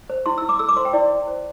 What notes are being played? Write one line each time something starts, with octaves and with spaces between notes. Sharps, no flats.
C5
E4 C6
E4 E6
D6
A4 E6
D6
C5 C6
G5
E4 D5
E4
C5